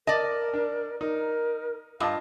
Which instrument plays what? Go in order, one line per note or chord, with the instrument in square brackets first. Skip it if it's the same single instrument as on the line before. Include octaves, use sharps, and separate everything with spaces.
[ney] A#4 [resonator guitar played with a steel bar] D5 D#5 [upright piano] A5
[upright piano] D4
[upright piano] D#4 [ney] A#4
[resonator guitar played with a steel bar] G2 [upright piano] F4 D#5 A5 [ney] F5